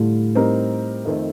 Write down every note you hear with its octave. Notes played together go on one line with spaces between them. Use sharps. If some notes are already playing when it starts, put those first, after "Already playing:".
Already playing: A2 D3 G3 D4 F4
G3 C4 D#4 G4 A#4
F2 D#3 A3 C4